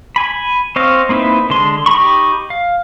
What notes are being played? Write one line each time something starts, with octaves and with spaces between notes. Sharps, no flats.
G#5 B5
C4 C5 C#5 D#5 F5
A#3 C4 D#4 E4 B4
D3 G#3 C6
D#4 G4 A#5 B5 C#6
F5